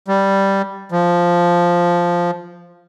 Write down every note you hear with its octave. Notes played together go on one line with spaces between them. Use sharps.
G3
F3